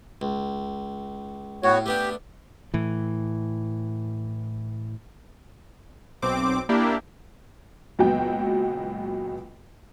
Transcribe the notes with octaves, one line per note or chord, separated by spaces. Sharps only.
C#2
A2 B3 F#4 C#5
A3 B3 D4 G4
A2 E3
B1 C4 D6
A#3 D4 E4 G4
C#2 A#2 F#3 B3 F#4 G5